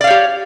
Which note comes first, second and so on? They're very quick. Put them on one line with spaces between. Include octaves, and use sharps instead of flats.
D5 F5 C#5 G4